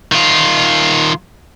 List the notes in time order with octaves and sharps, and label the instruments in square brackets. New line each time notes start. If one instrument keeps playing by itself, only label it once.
[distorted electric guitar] D#3 F4